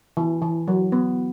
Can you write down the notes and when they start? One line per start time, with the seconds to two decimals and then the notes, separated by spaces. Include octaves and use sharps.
0.17 E3
0.42 E3
0.68 F#3
0.92 B3